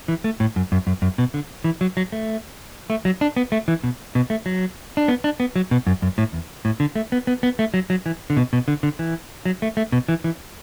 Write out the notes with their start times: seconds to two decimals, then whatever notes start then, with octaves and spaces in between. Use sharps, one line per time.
0.08 E3
0.24 A3
0.40 A2
0.56 F#2
0.72 F#2
0.87 F#2
1.02 F#2
1.18 B2
1.34 D3
1.64 E3
1.81 F#3
1.97 F#3
2.12 A3
2.90 A3
3.05 F#3
3.21 D4
3.36 B3
3.52 A3
3.68 E3
3.84 B2
4.15 B2
4.30 A3
4.46 F#3
4.97 D4
5.08 B3
5.24 D4
5.40 B3
5.56 F#3
5.71 B2
5.87 F#2
6.02 F#2
6.18 A2
6.33 E2
6.65 A2
6.80 D3
6.96 A3
7.12 B3
7.27 B3
7.43 B3
7.59 A3
7.74 F#3
7.90 F#3
8.06 E3
8.30 D3
8.37 B2
8.53 B2
8.68 D3
8.83 D3
8.99 E3
9.45 F#3
9.62 A3
9.77 A3
9.92 B2
10.08 E3
10.24 E3